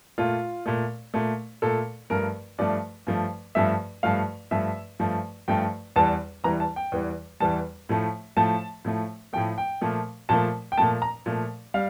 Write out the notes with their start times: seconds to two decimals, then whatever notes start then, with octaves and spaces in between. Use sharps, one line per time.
0.18 A#2 A3 F4
0.66 A#2 A3
1.14 A#2 A3
1.62 A#2 A3 A4
2.10 G2 F3 A3 A#4
2.58 G2 F3 A3 D5
3.07 G2 F3 A3
3.55 G2 F3 A3 E5
4.03 G2 F3 A3 F5
4.51 G2 F3 A3 E5
4.99 G2 F3 A3
5.48 G2 F3 A3 G5
5.96 E2 E3 G3 A5
6.44 E2 E3 G3 A#5
6.60 A5
6.76 G5
6.92 E2 E3 G3
7.40 E2 E3 G3 A5
7.89 A2 F3 A3
8.37 A2 F3 A3 A5
8.85 A2 F3 A3
9.33 A2 F3 A3 G5
9.58 G5
9.81 A#2 F3 A3
10.29 A#2 F3 A3 A5
10.72 G5
10.77 A#2 F3 A3 A5
11.02 A#5
11.26 A#2 F3 A3
11.74 G3 F5